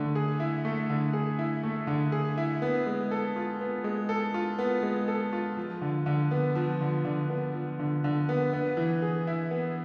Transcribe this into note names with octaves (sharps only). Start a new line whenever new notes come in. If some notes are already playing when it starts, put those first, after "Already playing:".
Already playing: D3 A3
G#4
E4
A3
D3
G#4
E4
A3
D3
G#4
E4
B3
G#3
A4
F4
B3
G#3
A4
F4
B3
G#3
A4
F4
F3
D3
D3
B3
F3
D3
D3
B3
F3
D3
D3
B3
B3
E3
G#4
E4
B3